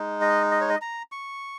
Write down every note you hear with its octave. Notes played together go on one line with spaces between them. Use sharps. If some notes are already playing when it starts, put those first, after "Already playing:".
Already playing: G#3 D#4
D#5
D#5
C#5
D#5
A#5
C#6